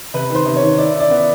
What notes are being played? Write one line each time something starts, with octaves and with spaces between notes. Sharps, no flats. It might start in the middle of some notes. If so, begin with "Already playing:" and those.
C3 B4
D#3 C5
C3
C#5
D#3
E4 D5
E4 D5
B3